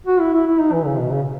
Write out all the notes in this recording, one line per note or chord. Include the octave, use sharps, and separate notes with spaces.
F#4
E4
E4
E4
D#4
E3
C#3
B2
C#3